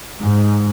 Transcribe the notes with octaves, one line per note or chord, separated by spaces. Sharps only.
G#2